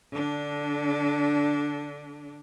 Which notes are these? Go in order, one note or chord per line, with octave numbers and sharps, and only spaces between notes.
D3 D4